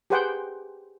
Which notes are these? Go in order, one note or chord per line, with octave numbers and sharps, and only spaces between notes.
G4 G#4 B4 C5 F#5 G5